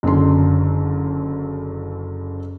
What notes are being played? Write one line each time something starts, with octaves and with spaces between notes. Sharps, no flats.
F#1 F#2 D3 C6